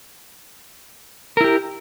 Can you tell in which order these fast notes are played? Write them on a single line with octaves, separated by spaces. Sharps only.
A#4 E4 G4